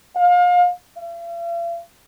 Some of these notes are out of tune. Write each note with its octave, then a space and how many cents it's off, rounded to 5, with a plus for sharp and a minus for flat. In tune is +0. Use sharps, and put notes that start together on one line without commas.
F5 +30
F5 -45